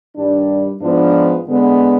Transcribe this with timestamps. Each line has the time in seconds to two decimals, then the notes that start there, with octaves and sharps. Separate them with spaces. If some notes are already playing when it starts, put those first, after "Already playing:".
0.15 G2 D#3 G3 D4
0.81 G#2 F3 B3 D4 F4
1.47 D3 G#3 B3